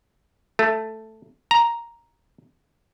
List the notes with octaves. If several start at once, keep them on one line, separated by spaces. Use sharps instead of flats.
A3
A#5